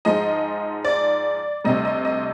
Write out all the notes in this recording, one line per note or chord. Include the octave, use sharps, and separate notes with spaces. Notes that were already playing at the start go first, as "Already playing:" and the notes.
G#2 F3 G#3 D#5
D5
D2 C3 G3 D#5
D#5
D#5